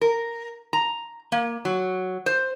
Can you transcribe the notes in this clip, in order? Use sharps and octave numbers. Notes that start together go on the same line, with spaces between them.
A#4
A#5
A#3
F#3
C5